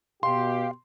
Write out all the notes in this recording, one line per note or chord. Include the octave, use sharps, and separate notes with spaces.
B2 G4 F5 C6